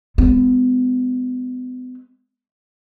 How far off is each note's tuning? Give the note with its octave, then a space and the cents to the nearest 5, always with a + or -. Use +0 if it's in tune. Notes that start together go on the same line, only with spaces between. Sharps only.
G#3 -15 B3 +35